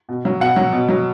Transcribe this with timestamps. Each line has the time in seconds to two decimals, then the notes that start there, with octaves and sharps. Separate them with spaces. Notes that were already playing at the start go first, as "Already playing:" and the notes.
0.09 B2
0.25 F#3
0.40 B2 F#5
0.56 F#3
0.72 B2
0.89 F#3